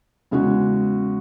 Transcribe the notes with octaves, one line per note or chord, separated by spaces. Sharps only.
E2 C#3 G#3 C#4 F#4